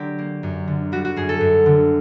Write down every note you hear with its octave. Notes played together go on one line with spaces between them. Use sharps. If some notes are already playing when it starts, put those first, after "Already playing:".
Already playing: D3 F#3 G4 A#4 D5
A#3
F#2
D3
G3 F#4
F#4
F#2 G#4
A4
F#2
D3